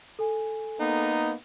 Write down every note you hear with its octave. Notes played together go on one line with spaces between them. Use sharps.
A4 G#5
A#3 B3 D#4